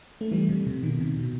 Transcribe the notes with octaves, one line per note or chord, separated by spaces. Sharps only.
A3
E3 G3
C3
C3
B2 D#3
C3
B2